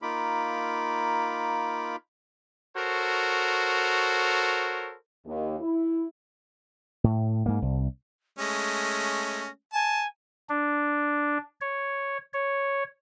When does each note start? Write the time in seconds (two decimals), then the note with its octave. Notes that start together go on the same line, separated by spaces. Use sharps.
0.02 A#3 D#4 F4 B5 D6
2.76 F#4 A4 A#4 C5 C#5
5.27 D#2
5.61 E4
7.04 A2
7.46 G#2 A#3
7.62 C2
8.39 G#3 A3 C#4 A#6
9.73 G#5 A5
10.49 D4
11.61 C#5
12.33 C#5